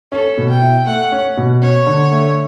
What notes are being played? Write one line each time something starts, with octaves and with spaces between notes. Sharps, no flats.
C#4 A4
B2
G5
E4
A3 F#5
C#4
B2
C#4 C#5
D3
A3